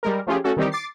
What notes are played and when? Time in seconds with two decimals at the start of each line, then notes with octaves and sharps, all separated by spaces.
0.03 G3 G#3 A#4
0.27 F3 A3 C#4 F4 G4 G#4
0.44 A3 C#4 F#4 A4
0.57 D#3 E3 G3 C4 D#4 G4
0.72 D6 A6 C7